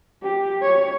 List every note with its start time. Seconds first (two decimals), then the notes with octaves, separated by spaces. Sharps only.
0.23 G4
0.62 C#5